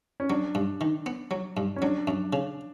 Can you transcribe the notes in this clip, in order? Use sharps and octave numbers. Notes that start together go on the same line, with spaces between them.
C#4
F#3 D4
G2
D#3
B3
F#3
G2
C#4
F#3 D4
F#2
C#3